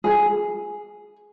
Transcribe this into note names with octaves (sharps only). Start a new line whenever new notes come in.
G#4